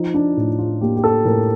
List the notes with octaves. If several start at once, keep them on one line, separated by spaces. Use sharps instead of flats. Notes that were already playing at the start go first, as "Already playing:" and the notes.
Already playing: F3 D#4
D4
A2
F4
A#3 G4
G4
A4
A2 A#4